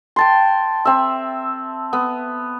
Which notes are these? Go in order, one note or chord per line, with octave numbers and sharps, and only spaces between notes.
G5 A5 C6
C4 E5
B3